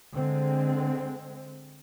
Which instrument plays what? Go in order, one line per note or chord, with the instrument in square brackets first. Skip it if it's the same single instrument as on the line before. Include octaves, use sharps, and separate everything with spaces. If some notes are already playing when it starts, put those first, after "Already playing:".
[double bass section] D3 G#3 C4